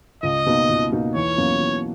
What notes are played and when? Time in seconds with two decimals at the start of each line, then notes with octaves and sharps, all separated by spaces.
0.23 C#2 D#5
0.46 B2 A#3 D#4
0.69 C#2
0.92 B2 A#3 D#4
1.15 E2 C#5
1.38 B2 F#3 A#3 C#4
1.61 E2